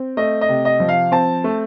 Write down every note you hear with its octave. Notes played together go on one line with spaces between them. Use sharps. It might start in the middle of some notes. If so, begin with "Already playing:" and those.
Already playing: C4
A3 D#5
D#5
C3
D#5
F3
F5
C4 A5
A3